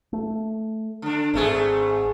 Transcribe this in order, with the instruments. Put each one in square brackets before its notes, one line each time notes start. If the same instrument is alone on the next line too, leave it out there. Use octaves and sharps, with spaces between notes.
[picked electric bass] A3
[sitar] D3 D4
[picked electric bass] G#1 C4 [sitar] G#2 A3 G#4